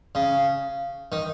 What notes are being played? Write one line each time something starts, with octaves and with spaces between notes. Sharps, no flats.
C#3
D#3